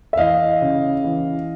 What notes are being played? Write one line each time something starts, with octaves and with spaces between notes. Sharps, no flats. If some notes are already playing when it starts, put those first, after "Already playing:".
E5
E3 D#5 F5
C#3
E3